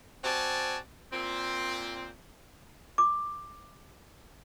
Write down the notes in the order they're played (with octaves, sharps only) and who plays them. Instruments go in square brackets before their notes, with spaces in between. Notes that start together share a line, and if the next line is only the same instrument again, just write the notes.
[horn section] C4 F#4 D5 G#5 A5
A#2 C4
[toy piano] D6